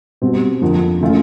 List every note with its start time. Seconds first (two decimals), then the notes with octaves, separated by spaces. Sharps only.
0.22 B2 G3 C4
0.62 F2 D3 F3 A#3
1.01 E3 A3 C#4 F4